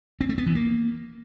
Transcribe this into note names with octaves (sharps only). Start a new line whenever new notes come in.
C4
A3
B3
E3
A#3